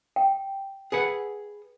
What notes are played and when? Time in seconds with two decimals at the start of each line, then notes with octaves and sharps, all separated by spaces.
0.16 G5
0.92 G#4 B4 F#5